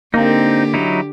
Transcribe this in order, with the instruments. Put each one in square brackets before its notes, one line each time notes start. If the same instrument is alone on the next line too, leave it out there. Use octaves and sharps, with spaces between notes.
[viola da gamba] D3 G4 [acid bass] A#3 [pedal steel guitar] C4 D#4
[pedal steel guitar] F#3 D#4 E4